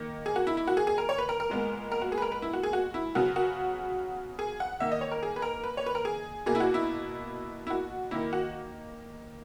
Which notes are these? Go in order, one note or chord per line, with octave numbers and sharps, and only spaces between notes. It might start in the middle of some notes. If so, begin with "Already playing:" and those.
Already playing: D#3 A#3
G#4
F#4
E4
E4
F#4
G#4
G#4
A#4
C#5
B4
A#4
A#4
A#2 G#3 B3
A#4
F#4
G#4
B4
A#4
B4
E4
F#4
G#4
F#4
E4
C#3 F#3 B3 F#4
F#4
G#4
F#5
D#3 A#3 E5
D#5
C#5
A#4
G#4
B4
A#4
B4
C#5
B4
A#4
G#4
B2 A#3 G#4
E4
F#4
E4
E4
F#4
D#3 A#3 E4
F#4